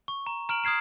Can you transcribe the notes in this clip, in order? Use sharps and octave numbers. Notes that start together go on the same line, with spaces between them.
C#6
A#5
A#5 F6 D7 F#7
D#6 F6 G#6 C7 E7